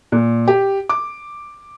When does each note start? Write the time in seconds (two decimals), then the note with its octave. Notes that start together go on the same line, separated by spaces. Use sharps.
0.12 A#2
0.48 G4
0.89 D6